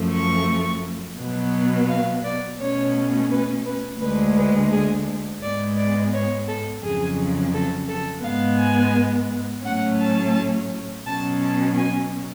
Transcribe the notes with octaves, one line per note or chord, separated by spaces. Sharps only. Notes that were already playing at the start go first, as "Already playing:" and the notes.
Already playing: F#2 F3 A3
C#6
B2 F#3 B3
F5
D5
B2 A3 C#4 C#5
B4
B4
D2 D3 G#3 B4
B4
G#4
G#2 G#3 B3 D5
D5
C#5
A4
F2 C#3 F#3 G#4
A4
A4
G#2 G#3 B3 F5
G#5
A2 F#3 A3 C#4 F#5
A5
B2 F#3 C#4 A5
A5
G#5